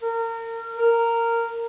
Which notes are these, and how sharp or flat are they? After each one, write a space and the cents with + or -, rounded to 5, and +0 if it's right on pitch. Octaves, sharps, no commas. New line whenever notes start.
A#4 -30
A#4 -10